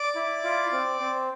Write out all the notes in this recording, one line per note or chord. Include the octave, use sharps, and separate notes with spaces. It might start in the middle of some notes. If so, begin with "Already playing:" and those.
Already playing: D5 D6
E4
F4
C4
C4